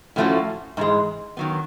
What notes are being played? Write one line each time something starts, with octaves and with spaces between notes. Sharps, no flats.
A2 F3 A3 C#4 F#4
G#2 E3 G#3
D#3 F#3 B3